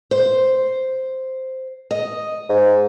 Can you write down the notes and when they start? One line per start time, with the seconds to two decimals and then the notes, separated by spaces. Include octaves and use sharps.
0.11 C5
1.91 D#5
2.49 G#2